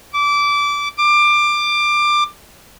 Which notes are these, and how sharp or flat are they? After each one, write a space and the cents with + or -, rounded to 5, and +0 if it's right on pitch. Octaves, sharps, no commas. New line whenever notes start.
D6 -20
D6 +20